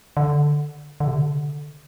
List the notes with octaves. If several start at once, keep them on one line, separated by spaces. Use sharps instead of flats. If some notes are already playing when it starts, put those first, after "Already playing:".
D3
D3
C3
D3